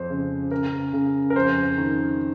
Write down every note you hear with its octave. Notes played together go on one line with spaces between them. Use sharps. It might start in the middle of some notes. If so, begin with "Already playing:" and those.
Already playing: F2 C5
C#3
C#3 A#4
C#3
A#4
F2 C5
D#3